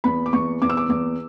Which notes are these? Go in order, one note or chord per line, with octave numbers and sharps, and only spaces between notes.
E2 B5
D6
E2 C#6
E2 D6
E6
D6
E2 D6